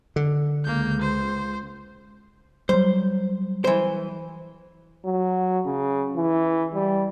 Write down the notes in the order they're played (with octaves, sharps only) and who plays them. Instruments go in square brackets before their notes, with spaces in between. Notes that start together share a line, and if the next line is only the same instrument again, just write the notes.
[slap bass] D3
[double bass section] C#2 [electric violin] A#3 G6
[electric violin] C5
[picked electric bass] F#3 G3 [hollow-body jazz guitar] C5
[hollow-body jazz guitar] E3 C5
[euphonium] F#3
C#3
E3
G3